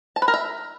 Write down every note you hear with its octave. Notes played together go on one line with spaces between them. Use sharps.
A5
B4
A#4
E5